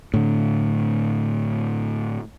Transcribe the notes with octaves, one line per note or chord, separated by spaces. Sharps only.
A2 D3